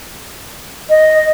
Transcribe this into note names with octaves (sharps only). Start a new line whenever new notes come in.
D#5